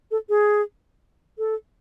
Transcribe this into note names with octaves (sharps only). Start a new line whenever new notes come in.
A4
G#4
A4